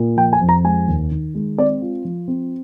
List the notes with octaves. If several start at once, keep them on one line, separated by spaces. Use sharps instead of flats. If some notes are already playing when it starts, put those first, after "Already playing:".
Already playing: A#2
F3 G5
G#5
F2
A#5
G#3 G#5
D#2
D#3
G#3
C4 D5
F4
F3
C4